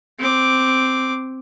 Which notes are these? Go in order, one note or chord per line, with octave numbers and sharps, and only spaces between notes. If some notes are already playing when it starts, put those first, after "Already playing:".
C4 D6